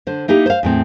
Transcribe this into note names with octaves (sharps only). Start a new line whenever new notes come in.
D3 C5
A#3 D#4 E4 G4
C5 F5
E2 A2 C4